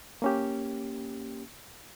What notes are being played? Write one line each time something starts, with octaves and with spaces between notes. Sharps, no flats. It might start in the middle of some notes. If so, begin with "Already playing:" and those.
A#3 C#4 G4